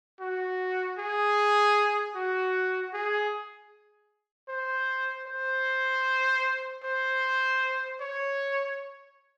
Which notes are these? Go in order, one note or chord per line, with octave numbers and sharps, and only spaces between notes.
F#4
G#4
F#4
G#4
C5
C5
C5
C#5